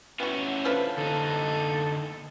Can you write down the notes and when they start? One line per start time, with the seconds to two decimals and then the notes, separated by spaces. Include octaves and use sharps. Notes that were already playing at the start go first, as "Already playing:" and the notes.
0.20 B3 C#4 E4 F#4
0.65 D3 F3 B4
0.97 D2 D#4 A4